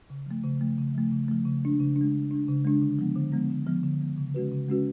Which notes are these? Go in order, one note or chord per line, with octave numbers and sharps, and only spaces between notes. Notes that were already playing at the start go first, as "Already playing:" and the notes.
C#3
F3 A3
C#3
F3 A3
C#3
F3 A3
C#3
F3 A3
C#3
G#3 D4
C#3
G#3 D4
C#3
G#3 D4
C#3
G#3 D4
D3
F3 G#3 B3
D3
F3 G#3 B3
D3
F3 G#3 B3
D3
F3 G#3 B3
C#3
G#3 C#4 F#4 B4
C#3
G#3 C#4 F#4 B4